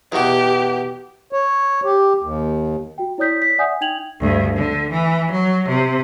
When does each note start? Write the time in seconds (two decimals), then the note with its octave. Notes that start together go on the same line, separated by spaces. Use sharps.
0.12 E2 B2 G4
1.33 C#5
1.85 G4
2.23 D#2
2.98 F#4 G5
3.18 E4 C#5 D5 D#6 G6 B6
3.42 B6
3.58 D5 E5 F#5 G#5 D#6 G6
3.81 D#4 G5 G#6 F7 F#7
4.21 D2 G2
4.56 D3
4.91 E3
5.32 F#3
5.69 C3